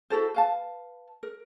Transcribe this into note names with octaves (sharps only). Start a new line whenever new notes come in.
E4 F#4 A4 C5
B4 F5 A5
A#4